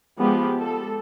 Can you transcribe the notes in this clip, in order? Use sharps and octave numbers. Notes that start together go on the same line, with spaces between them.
F3 G#3 B3 G4
A4